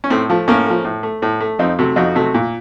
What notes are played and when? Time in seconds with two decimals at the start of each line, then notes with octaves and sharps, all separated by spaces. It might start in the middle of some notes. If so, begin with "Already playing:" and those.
0.04 C#4
0.10 A2 A3 C4
0.29 F3 A3
0.48 A2 A#3 C#4
0.66 F3 A3
0.85 A2
1.03 A3
1.22 A2
1.41 A3
1.59 F2 C4 D#4
1.79 C3 F#3 A3
1.96 F2 D#4 F#4
2.15 C3 F#3 A3
2.34 A#2